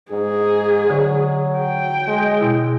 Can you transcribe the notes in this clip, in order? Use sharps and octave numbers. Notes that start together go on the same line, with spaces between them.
G#2 G#4
D3 F#3 C#6
G5
G#3
B2 E4